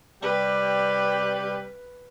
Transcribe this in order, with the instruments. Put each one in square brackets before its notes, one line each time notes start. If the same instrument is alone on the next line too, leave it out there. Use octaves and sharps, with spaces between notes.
[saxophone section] C3 G3 G4 [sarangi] B4